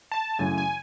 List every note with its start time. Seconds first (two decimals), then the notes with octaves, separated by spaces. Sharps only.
0.12 A5
0.39 F#2 C#3 E3 A3 G#5
0.58 G#5